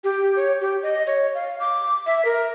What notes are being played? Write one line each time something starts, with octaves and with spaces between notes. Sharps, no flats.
G4
C#5
G4
D#5
C#5
F5
D6
E5
A#4